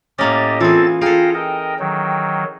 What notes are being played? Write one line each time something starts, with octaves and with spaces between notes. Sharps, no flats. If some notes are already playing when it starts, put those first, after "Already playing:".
A2 A#3 C#4 G4 D#5 A6
E3 C4 F4 G#4 A4 A6
G#4 A4 F5 G5 A#5
A#4 D#5 G5
D#3 F#3